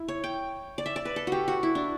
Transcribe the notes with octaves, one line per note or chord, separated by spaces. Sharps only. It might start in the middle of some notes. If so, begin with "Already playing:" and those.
Already playing: E4
C#5
G5
D5
E5
D5
B4
A4
F#4 G4
F#4
E4
D4